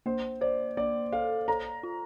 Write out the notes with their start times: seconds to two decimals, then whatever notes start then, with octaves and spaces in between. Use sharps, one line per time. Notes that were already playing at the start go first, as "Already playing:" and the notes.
0.06 A#3 C5
0.41 C5 D5
0.77 A#3 D5
1.12 A4 F5
1.48 A4 A#5
1.83 F4